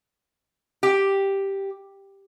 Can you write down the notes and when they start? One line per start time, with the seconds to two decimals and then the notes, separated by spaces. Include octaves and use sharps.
0.83 G4